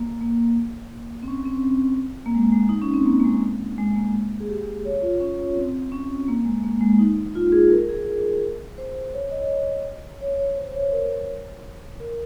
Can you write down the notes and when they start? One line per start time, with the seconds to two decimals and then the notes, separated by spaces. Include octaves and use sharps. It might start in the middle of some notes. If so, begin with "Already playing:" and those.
Already playing: A#3
0.21 A#3
1.23 C4
1.28 C#4
1.45 C4
2.26 A#3
2.35 G#3
2.52 G#3
2.69 D#4
2.82 C#4
2.94 C4
3.06 A#3
3.20 A#3
3.24 G#3
3.78 G#3
3.96 A#3
4.40 G#4
4.49 G4
4.85 C#5
5.02 F4
5.20 C#4
5.56 C4
5.92 C#4
6.28 A#3
6.45 G#3
6.63 A#3
6.81 G#3
6.99 D#4
7.35 F4
7.52 G#4
7.71 A#4
7.89 G#4
8.78 C5
9.14 C#5
9.31 D#5
10.21 C#5
10.39 C#5
10.57 C5
10.74 C#5
10.92 A#4
12.00 A#4